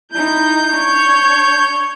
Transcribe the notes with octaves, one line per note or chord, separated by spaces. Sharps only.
D#4 E4 G6
D4 C#5